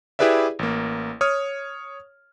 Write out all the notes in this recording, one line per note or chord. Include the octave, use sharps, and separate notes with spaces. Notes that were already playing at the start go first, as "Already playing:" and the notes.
E4 G4 G#4 B4 D5 E5
A1 A#3
C#5 D#6 F6